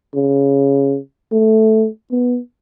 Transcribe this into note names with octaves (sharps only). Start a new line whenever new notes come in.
C#3
A3
B3